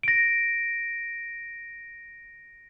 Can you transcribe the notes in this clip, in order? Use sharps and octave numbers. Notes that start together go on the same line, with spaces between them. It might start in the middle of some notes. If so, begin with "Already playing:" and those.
A#6 D7